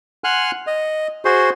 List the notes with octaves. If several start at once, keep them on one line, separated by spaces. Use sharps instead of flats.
F#5 G#5 C6 F6 F#6
D#5
F#4 G#4 C5 C6